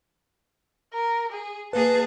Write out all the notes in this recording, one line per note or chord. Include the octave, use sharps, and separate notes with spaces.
A#4
G#4
A#3 G#4 B4 A5